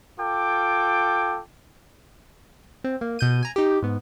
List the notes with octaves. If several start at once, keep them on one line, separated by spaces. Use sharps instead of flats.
F4 A4 G5 D6
C4
A#3
B2 G6 D#7
G#5 A#5
D#4 G4
G#2 B3